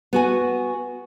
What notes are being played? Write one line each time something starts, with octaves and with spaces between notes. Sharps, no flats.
B3 F#4 G#5